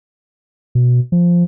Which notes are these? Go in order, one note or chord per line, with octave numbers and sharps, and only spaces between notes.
B2
F3